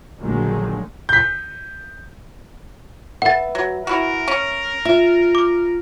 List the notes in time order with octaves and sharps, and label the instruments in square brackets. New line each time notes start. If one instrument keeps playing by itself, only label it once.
[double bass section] A#1 D3 D#3 F#3 G#3 A#3
[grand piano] G6 B6
[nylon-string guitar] B4 E5 [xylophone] F#5 A6
[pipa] F#3
[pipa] E4 F#4 [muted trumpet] A#4
[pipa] C#4
[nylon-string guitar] F4 [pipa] E5
[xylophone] D6